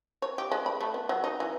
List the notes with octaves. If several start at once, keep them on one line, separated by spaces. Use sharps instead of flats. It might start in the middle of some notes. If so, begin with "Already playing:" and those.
C#5
G4
G#3
B5
A3
B3
F#3
D#4
E3